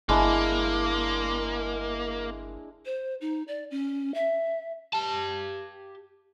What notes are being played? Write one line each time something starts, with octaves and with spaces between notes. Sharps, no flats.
G1 G#3 A#3 D4 E4
C5
D#4
D5
C#4
E5
G4 A5